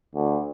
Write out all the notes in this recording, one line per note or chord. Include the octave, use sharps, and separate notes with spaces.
D2